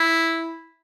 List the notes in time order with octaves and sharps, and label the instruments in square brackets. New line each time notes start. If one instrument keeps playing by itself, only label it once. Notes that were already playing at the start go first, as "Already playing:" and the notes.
Already playing: [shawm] E4